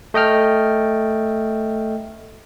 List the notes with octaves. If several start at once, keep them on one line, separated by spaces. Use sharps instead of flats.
A3 D#5 G5 F6